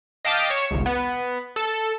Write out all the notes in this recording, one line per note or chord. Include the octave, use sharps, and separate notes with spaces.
D#5 F5 G5 A5 D6 B6
C#5 C#7 E7
G#1 C#2
B3
A4